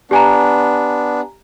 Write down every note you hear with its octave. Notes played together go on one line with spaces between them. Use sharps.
B3 D4 G4 G#5 A#5